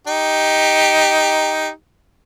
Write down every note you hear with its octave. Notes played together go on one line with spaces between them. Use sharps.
D#4 G4